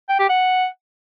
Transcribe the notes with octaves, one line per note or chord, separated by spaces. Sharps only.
G5
G4
F#5